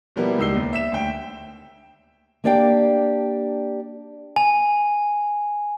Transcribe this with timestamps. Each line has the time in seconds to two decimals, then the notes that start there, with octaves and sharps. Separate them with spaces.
0.16 B2 F3 G3 A#3 B3 E4
0.38 C#2 G3 D#4 E6 C7 G7
0.56 D#2
0.73 E5 B6 E7
0.92 D2 G5
2.44 A#3 D4 G4 D5 F5 G5
4.36 G#5